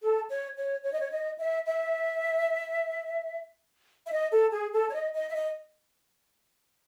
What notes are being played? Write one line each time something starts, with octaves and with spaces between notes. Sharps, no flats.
A4
C#5
C#5
C#5
D#5
C#5
D#5
E5
E5
E5
D#5
A4
G#4
A4
C#5
D#5
D#5
E5
D#5